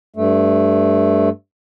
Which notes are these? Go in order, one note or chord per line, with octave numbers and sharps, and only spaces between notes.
G2 A3